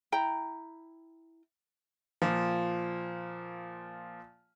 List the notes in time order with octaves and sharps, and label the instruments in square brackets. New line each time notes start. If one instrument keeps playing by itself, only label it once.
[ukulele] E4 G5 A#5
[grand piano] A#2 F3